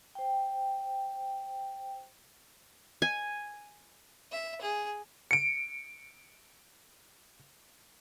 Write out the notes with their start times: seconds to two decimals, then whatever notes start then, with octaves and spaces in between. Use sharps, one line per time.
0.15 C5 G5
3.02 G#5
4.32 E5
4.61 G#4
5.31 C#7 D7